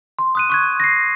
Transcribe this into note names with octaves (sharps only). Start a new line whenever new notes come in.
C6
D#6 F#6 D#7
C#6 F#6 G#6
A#6 C7